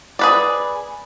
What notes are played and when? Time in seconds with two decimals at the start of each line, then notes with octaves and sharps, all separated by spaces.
0.19 G#4 B4 D5